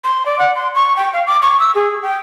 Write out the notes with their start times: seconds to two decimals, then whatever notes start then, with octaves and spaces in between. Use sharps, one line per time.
0.04 C6
0.26 D5
0.39 F#5
0.55 C6
0.75 C#6
0.96 G5
1.13 F5
1.27 D6
1.42 C#6
1.59 E6
1.75 G#4
2.02 G5